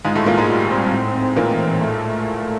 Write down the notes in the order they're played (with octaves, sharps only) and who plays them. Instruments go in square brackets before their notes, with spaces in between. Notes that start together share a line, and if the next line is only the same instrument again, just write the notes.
[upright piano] G#2 G#3 [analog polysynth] F4
[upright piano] A2 A3
[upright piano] A#2 A#3 [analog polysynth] F4
[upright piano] G#2 G#3
[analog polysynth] G3
C4
A2
C4
[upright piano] A#2 A#3 [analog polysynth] E3
[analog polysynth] A2
A3